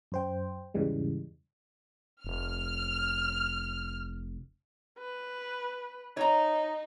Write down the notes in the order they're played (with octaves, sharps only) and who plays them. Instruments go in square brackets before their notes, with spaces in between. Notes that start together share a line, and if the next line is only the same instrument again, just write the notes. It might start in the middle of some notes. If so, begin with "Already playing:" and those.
[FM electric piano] F#2 C5 G5
E2 G#2 C#3 E3 G3 G#3
[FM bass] F1 [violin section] F6
[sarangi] B4
[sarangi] D#4 [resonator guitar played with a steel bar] C#5 A#5